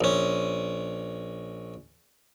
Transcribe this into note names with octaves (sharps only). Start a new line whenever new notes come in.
A#1 C#4